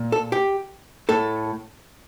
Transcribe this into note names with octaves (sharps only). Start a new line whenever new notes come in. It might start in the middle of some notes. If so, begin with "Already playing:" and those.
Already playing: A#2
A4
G4
A2 A4